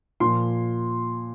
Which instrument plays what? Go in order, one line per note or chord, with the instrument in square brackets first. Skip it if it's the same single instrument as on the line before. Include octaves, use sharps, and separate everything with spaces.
[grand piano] A#2 F3 C6